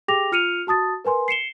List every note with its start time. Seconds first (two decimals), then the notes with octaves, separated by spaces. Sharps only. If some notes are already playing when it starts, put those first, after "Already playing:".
0.08 G4 G#4 G5 D6 A#6 F7
0.32 F4 F6 C#7 D#7 F7
0.67 F#4 A5 D#6 A6
1.05 A#4 B4 G#5 C6
1.28 C7 C#7 E7 G7